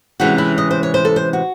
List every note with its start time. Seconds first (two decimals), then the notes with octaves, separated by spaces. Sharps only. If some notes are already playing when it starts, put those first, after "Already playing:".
0.20 C3 E3 G#3 C#4 F#4
0.38 E4
0.58 D#5
0.71 C5
0.83 C#5
0.94 C5
1.05 A4
1.16 C5
1.33 F#4